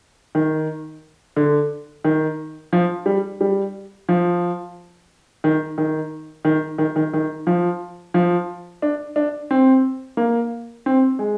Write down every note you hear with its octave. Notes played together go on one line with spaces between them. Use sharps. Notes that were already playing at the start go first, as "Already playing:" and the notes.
D#3
D3
D#3
F3
G3
G3
F3
D#3
D#3
D#3
D#3
D#3
D#3
F3
F3
D4
D4
C4
A#3
C4
G#3